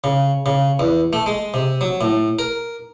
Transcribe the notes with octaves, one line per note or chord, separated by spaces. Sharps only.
C#3
C#3
E2
A3
G#3
C3
F#3
A2
A#4